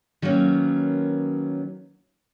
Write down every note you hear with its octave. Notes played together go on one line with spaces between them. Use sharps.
D#3 F#3 A#3 B3 C#4